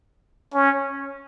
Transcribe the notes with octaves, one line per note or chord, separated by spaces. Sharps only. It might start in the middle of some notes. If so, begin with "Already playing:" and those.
C#4